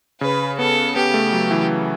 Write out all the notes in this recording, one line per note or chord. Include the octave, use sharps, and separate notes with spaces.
C#3 B4
B3 A4
B3 G4
A3
F#3
E3